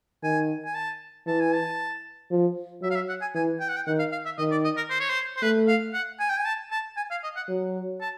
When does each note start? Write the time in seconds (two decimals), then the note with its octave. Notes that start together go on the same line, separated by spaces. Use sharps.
0.23 D#3 G#5
0.65 G#5
0.75 A5
1.27 E3 A5
1.40 G#5
1.54 A5
2.31 F3
2.82 F#3 E5
2.90 F5
2.95 E5
3.09 F#5
3.21 G#5
3.35 E3 G#5
3.60 G5
3.69 F#5
3.76 G5
3.87 D#3 F#5
3.99 F5
4.12 F5
4.25 E5
4.38 D#3 D#5
4.51 D5
4.64 D#5
4.77 A#4
4.90 C5
5.00 C#5
5.09 C5
5.37 C5
5.42 A3 B4
5.68 F5
5.94 F#5
6.19 G#5
6.30 G5
6.37 G#5
6.45 A5
6.71 A5
6.97 G#5
7.10 F5
7.23 D#5
7.36 F#5
7.49 F#3
8.01 A5